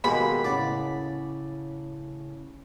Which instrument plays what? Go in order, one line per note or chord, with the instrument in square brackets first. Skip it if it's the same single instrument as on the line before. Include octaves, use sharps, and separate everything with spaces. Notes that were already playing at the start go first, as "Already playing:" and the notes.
[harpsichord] B2 G#3 A#3 [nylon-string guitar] D#3 B3 G4 [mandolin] B5
[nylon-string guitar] A2 C#3 F#5 [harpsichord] D5